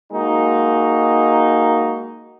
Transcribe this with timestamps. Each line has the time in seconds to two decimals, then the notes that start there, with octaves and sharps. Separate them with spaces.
0.13 G#3 A#3 D#4 F#4